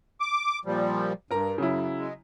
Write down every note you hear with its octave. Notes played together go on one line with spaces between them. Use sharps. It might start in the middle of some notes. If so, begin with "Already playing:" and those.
D6
A#2 F3 G3
G2 A#4 A#5
F#2 C#3 F#3 E4
G#3